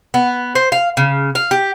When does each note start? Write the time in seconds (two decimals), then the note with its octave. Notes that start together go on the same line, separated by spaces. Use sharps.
0.14 B3
0.55 C5
0.72 F5
0.97 C#3
1.35 F5
1.51 G4